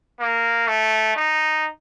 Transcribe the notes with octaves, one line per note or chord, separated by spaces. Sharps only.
A#3
A3
D#4